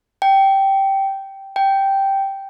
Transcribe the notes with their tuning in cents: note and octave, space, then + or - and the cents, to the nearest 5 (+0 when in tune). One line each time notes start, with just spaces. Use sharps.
G5 -10
G5 -5